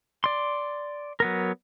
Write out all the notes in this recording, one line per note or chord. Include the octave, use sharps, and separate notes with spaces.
D5 C6
F#3 B3 A#4